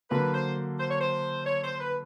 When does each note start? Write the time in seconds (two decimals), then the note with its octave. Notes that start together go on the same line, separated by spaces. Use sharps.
0.11 D3 F#3 A#3 B4
0.34 C5
0.79 C5
0.91 C#5
1.01 C5
1.46 C#5
1.64 C5
1.80 B4